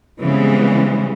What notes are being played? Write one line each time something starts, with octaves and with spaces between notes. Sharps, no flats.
C#3 E3 G3 G#3 B3 C4